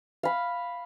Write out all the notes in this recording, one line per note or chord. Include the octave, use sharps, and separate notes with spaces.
F5 B5